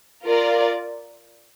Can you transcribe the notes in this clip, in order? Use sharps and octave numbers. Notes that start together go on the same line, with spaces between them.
F4 A#4 D5